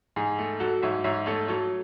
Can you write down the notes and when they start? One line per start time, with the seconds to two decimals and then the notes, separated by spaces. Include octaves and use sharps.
0.16 G#2 G#4
0.38 A3
0.60 F#3 F#4 A4
0.82 G#2 C#5 E5
1.04 G#2 C#5 E5
1.26 A3 A4 C#5
1.48 F#3 A4 C#5